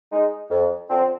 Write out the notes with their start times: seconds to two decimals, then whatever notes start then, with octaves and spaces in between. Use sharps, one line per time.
0.12 G#3 D#4
0.51 F2
0.90 D3 F3 C4